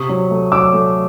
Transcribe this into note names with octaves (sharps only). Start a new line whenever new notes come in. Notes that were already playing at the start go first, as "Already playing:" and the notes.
Already playing: C3 C#6 D#6
F#3
A3
F#3 D6 E6
A3